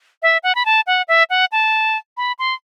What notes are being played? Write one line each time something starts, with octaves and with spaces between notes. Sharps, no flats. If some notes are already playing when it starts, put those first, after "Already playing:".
E5
F#5
B5
A5
F#5
E5
F#5
A5
B5
C6